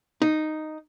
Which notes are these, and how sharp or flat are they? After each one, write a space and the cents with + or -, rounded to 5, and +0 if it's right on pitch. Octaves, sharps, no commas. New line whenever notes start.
D#4 -5